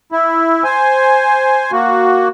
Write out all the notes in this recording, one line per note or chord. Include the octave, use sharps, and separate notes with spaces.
E4
C5 G#5
A#3 F#4